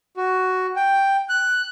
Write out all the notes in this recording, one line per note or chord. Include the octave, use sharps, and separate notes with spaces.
F#4
G5
F#6